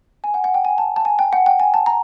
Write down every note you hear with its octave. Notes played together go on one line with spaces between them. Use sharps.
G#5
F#5
F#5
G5
G#5
A5
A5
G#5
G5
F#5
G5
G#5
A5
A#5